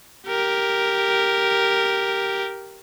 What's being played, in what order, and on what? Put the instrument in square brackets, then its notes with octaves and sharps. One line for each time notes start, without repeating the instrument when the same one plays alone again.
[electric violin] G4 A#4